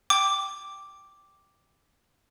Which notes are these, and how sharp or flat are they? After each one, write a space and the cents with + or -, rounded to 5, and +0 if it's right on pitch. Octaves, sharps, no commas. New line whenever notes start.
G5 -5 D6 +0